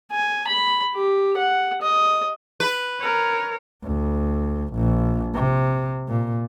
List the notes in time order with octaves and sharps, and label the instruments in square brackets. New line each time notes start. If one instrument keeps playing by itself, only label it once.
[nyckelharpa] G#5
B5
G4
F#5
D#5
[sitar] B4
[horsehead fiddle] A#4 C#5
[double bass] D2
A#1
C3
A#2